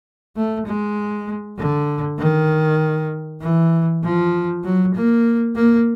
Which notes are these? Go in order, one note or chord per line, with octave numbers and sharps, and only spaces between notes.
A3
G#3
D3
D#3
E3
F3
F#3
A#3
A#3